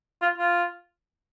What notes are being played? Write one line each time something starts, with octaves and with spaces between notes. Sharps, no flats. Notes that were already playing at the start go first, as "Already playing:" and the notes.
F4
F4